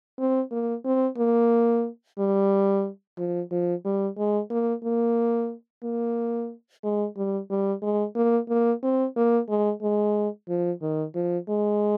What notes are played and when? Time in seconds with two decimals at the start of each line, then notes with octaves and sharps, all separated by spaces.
0.19 C4
0.52 A#3
0.85 C4
1.18 A#3
2.19 G3
3.18 F3
3.51 F3
3.85 G3
4.17 G#3
4.50 A#3
4.83 A#3
5.83 A#3
6.84 G#3
7.17 G3
7.50 G3
7.83 G#3
8.16 A#3
8.49 A#3
8.83 C4
9.16 A#3
9.49 G#3
9.82 G#3
10.48 F3
10.82 D#3
11.15 F3
11.49 G#3